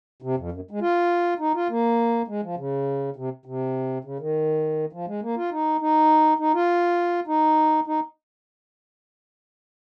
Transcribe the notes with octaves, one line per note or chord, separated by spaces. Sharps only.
C3
F2
F#2
G#3
F4
D#4
F4
A#3
G#3
F3
C#3
C3
C3
C#3
D#3
F3
G#3
A#3
F4
D#4
D#4
D#4
F4
D#4
D#4